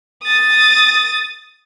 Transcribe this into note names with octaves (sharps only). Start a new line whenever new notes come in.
D#6 A6